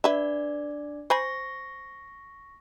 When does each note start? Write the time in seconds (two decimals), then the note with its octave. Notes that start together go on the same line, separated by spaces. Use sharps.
0.04 D4 B4 D5 E5
1.10 C5 G#5 B5 C#6 A#6